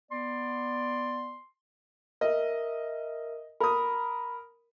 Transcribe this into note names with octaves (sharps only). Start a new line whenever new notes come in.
B3 D5 C6
A#4 D#5 E5
A#4 B5 D#6